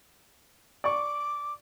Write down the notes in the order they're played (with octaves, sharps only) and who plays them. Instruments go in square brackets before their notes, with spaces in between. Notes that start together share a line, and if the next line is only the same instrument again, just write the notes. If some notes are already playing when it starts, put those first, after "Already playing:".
[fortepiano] D5 C#6 [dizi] D6